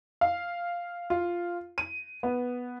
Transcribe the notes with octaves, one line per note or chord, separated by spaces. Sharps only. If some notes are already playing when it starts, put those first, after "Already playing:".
F5
F4
D#7
B3